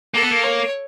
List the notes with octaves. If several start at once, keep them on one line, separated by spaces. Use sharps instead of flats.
A#3 A4
B3
A#3
C#5